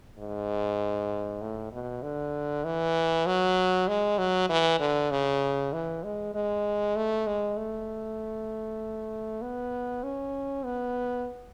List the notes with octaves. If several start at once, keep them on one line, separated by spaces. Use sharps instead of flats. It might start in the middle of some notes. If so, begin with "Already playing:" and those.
G#2
A2
B2
D3
E3
F#3
G#3
F#3
E3
D3
C#3
E3
G#3
G#3
A3
G#3
A3
B3
C#4
B3